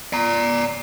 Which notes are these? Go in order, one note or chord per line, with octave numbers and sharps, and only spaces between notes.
D5 A#5